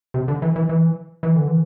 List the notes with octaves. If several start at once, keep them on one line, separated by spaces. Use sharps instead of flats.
C3
D3
E3
E3
E3
E3
D3
E3